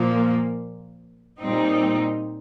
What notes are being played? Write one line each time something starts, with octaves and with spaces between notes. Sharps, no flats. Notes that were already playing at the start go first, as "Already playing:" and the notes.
Already playing: A#2 F3 A#3
A#2 G3 C4 D#4